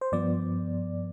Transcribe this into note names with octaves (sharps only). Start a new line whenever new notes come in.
C5
G2 F3 B3 D5